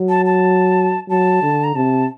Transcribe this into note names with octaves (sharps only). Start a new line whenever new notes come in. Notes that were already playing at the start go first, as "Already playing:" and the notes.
Already playing: F#3
A5
A5
F#3 A5
D3
A#5
C3 A5